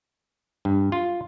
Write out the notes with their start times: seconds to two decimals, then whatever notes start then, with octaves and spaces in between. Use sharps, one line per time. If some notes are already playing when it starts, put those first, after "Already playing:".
0.65 G2
0.92 F4